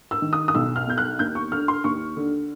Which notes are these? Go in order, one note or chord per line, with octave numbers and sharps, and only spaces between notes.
E6
D#3
D#6
D#6
B1 E6
F6
B2 G6
F#6
D#2 G6
C#6
D3 F6
C6
D#2 C#6
D3